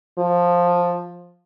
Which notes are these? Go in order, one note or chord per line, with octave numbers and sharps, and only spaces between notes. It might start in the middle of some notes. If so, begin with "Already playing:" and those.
F3